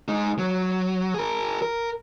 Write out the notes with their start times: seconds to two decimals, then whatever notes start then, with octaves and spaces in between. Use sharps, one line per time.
0.08 G#3 D#4
0.39 F#3
1.14 G#4 A#4
1.62 A#4